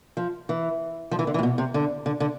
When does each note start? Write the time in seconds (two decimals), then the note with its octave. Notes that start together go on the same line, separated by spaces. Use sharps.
0.17 F3
0.49 E3
1.11 F3
1.19 E3
1.27 D3
1.34 E3
1.39 A2
1.43 B2
1.58 C3
1.74 D3
2.06 D3
2.20 D3